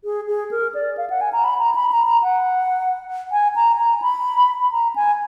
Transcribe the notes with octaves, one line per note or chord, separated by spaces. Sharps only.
G#4
G#4
A#4
D5
F5
F#5
G#5
A#5
B5
A#5
B5
A#5
A#5
F#5
G#5
A#5
A#5
B5
A#5
G#5